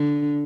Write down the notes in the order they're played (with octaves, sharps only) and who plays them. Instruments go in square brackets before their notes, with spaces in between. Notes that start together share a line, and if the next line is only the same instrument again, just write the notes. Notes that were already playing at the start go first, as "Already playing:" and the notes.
Already playing: [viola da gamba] D3